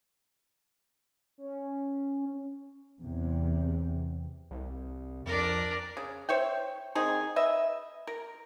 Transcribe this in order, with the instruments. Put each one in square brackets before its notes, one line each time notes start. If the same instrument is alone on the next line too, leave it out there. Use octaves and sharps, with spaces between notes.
[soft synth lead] C#4
[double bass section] E2 C3
[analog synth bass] C2
[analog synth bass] F2 [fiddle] D4 A#4
[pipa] C#3
C5 C#5 E5 G5
D#3 C4 D#4 G#4
B4 D#5 E5
A#4